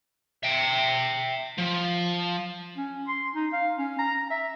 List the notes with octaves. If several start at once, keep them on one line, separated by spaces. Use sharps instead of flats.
E5 G5
F3
C#4
C6
D#4
F5
C#4
A#5
E5